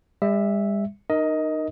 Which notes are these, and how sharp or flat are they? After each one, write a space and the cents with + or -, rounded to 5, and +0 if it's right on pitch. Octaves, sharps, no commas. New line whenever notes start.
G3 +45 E5 +0
D#4 -30 A#4 +0 D#5 +15